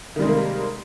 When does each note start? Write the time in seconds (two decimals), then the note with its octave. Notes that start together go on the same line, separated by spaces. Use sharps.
0.16 D#3
0.19 G3
0.22 G#3
0.25 C3
0.28 A#3